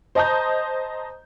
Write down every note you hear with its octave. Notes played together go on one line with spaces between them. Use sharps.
C5 D#5 A5 A#5 D#6 G6